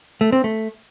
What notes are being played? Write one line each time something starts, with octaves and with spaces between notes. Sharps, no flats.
A3
C4
A3